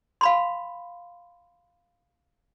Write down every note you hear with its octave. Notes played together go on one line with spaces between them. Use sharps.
F5 B5 C6